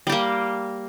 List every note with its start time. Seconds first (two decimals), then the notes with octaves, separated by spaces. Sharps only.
0.07 G3
0.09 G4
0.12 A#3